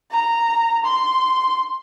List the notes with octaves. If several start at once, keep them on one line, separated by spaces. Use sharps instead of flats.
A#5
C6